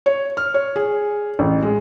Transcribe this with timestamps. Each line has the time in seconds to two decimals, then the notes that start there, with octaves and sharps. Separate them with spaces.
0.06 C#5
0.37 F6
0.54 C#5
0.76 G#4
1.39 A1
1.62 G#3